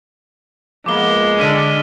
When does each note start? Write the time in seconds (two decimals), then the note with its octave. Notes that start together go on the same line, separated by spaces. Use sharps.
0.86 F3 G#3 A#3 B3 D6 G7
1.39 D3 D4 F6 B6 D#7